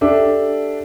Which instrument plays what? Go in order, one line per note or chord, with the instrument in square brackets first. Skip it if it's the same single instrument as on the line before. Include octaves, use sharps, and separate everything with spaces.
[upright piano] D4 G4 A4 E5